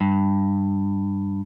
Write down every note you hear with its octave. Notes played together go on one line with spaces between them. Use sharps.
G2